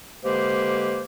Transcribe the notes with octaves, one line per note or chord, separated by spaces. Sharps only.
D3 G#3 A#3 G4 B4 C5